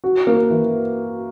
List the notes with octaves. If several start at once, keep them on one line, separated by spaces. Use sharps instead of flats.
F#4
A#3
E3